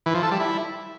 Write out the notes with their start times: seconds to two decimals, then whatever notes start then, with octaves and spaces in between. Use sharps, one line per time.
0.06 E3
0.15 F3
0.23 A4
0.31 G3
0.40 E4